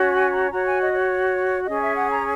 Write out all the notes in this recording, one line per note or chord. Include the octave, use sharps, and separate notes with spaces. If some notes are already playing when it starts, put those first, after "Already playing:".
Already playing: C#4 F#4 C#5
G#5
A#5
F#4 C#5 A#5
G#5
D#5
C#5
C#4 G#4 C#5 D#5
E5
F#5
A#5